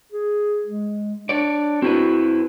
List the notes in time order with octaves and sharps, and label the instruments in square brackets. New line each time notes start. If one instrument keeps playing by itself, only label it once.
[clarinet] G#4
G#3
[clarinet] D4 [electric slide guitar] C#5 D5
[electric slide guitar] C4 E4 B4 [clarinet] F#4